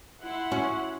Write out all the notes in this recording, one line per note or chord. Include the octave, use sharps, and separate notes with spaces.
E4 F#5 C6
C#4 F#4